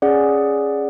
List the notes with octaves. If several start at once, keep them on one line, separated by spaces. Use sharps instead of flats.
C#4 G#4 D5 F#5